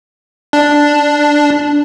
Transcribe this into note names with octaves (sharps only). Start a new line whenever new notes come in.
D4